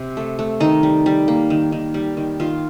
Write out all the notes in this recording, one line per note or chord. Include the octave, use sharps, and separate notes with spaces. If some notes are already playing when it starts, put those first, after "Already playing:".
Already playing: C3
A3
A3
D#3 D#4
G3
G3
A#3
D#3
D#3
G3
D#3
D#3 F4